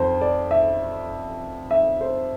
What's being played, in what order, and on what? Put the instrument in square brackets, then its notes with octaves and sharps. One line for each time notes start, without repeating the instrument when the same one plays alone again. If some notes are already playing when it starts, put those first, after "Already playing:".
Already playing: [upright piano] F2 C5
D5
E5
E5
C5